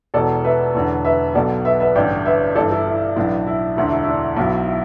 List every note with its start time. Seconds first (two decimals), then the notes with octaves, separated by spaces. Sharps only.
0.14 E1 E2 B2 A4 D5
0.44 B4 E5
0.75 E1 E2 D3
1.05 B4 E5
1.35 B1 B2 A4 D5
1.65 B4 E5
1.80 B4 E5
1.95 A1 G2 D3 D5 G5
2.26 B4 E5
2.55 G1 G2 E3 A4 D5
2.71 E4 A4
2.87 E4
3.16 B1 A2 E3 D4
3.47 E4
3.77 E1 D2 D3 E4
3.92 E4
4.03 E4
4.08 D4
4.37 B1 B2 E4
4.67 E4